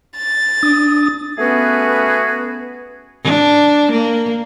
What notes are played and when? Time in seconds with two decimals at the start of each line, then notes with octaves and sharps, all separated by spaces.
0.17 A6
0.63 D4 D#6
1.38 A3 B3 C#4 F#4 G#4 B4
3.24 D4
3.92 A#3